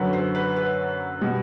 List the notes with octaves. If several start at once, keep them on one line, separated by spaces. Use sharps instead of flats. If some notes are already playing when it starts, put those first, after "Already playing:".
Already playing: F#2 D3 F#3 B4
C5
B4
B4
B2 G3